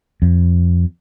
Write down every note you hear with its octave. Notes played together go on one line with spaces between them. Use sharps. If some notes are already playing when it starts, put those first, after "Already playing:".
F2